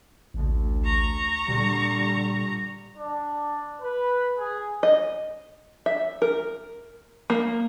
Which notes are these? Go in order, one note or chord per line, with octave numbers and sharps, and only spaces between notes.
A1 D2
A#5 C#6
A#2 D3 G3
D4
B4
G#4
D#5
E5
A#4
A#3